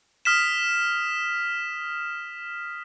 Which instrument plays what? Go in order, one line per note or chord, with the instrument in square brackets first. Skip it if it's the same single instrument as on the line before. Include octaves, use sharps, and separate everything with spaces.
[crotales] D#6 F6 B6 E7